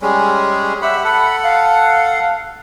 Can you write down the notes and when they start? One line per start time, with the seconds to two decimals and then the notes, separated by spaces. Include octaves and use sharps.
0.02 G3 G#3 C#4 G#4
0.82 G4 E5 F#5 B5
1.04 A4 F#5 B5
1.43 F5